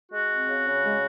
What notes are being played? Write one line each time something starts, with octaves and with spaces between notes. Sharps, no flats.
G#3 F#4
C4
C#3
C#3
G#3